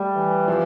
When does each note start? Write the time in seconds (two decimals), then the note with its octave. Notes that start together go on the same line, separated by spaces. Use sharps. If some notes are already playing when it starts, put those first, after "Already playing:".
Already playing: G3 A3
0.16 E3
0.48 C3 F3